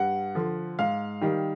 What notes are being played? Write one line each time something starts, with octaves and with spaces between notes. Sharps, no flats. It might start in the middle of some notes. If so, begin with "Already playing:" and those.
Already playing: G2 F#5
D3 F3
G#2 F5
D#3 G3